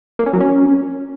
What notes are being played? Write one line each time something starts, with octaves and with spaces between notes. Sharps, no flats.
A#3
C#4
F#3
C#4